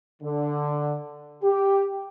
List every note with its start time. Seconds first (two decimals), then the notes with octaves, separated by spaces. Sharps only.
0.23 D3
1.43 G4